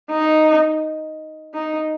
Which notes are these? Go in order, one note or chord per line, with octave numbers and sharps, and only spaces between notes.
D#4
D#4